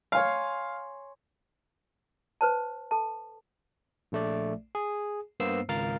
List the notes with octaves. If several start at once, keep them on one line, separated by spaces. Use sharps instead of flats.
C#5 F5 G#5 C6
B4 C5 A5
A4 A5
A#1 A3 D5
G#4
G2 A#3 B3 C5 E6 C7
G#1 C#2 A#4 F5 F6 A6